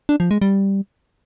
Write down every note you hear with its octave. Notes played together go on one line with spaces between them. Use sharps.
D4
F3
G#3
G3